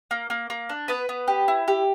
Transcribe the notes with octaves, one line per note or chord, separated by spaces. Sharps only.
A#3
A#3
A#3
D4
B3 B4
B3
G4
E4
G4